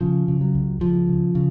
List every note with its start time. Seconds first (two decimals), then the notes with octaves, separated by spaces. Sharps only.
0.01 C#3 F3
0.28 C#3
0.41 F#3
0.55 C#2
0.81 C#2 F3
1.08 C#3
1.35 C#3